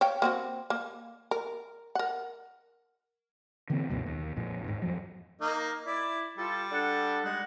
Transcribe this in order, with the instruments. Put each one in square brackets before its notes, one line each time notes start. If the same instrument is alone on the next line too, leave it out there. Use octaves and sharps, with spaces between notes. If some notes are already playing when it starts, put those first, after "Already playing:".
[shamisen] C#5 F5 G5
A#3 C4 F#4
A#3
A#4
A#4 F#5
[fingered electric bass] D3 E3 A#3 C4
C#2 F#2 B2
D#2
A#1 F2 A#2
D#1 G#2
F2 F3 F#3
[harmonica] A#3 D#4 D#5
[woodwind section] E4 [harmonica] D5
[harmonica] G3 [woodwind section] F4 A4
[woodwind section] D4 A4 F#5
[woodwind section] G3 G#3 D#4 [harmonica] F#5